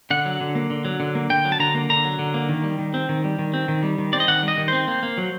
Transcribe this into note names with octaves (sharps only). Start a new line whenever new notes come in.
D3 F#5
F#3
D3
A#3
D3
F#3
D3
A#3
D3 G5
F#3
A5
D3 A#5
A#3
D3 A#5
F#3
D3
A#3
D#3
G3
D#3
C4
D#3
G3
D#3
C4
D#3
G3
D#3
C4 D5
D#5
D#3 F#5
G3
D#5
D#3
C4 C5
A#3
A#3
F#3